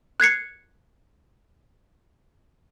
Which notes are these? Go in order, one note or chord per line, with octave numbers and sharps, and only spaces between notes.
F#6 G#6 C7 C#7